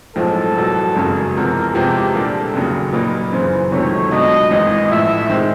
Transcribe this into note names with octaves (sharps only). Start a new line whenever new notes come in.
B1 A2 F3 G#3 C4 A4
E1 E2 B2 F#3
G#1 F#2 C#3 F#3
E2 C3 F3 G#3 A#4
E2 C3 F3 G#3 C4 G4
A#2 G3 A#3 D4 A4
F1 D#2 C#3 F#3
A#2 F#3 A#3 D#4 B4
F#2 C#3 E3 C5
C#2 C3 D#3 F#3 A3 C#5
C#2 B2 F#3 B3 D4 D#5
G#1 G#2 E3 D#5
A1 A2 F3 E5
D#3 G#3 C4